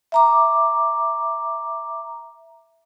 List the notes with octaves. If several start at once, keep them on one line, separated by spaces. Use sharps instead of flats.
E5 A#5 D6